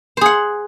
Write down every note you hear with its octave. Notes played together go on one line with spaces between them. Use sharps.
G#4 C5 F#5